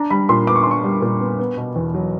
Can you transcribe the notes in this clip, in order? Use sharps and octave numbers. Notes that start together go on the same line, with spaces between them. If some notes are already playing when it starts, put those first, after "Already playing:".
Already playing: D4 A#5
G3 B5
A#2 C6
B3 D6
C#6
D4 C6
C#6
G3
A#2
B3
B3
B2
E2
F#3